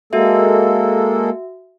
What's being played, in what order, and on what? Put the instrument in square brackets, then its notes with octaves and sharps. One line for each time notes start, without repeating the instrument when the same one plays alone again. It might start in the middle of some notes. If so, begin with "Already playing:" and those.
[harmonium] G#3 A#3 A4 [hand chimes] F#4 E5